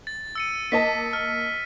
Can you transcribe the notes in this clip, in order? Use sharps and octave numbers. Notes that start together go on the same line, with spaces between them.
A6
E6 C#7 D#7
A#3 D#5 A5 B6
F6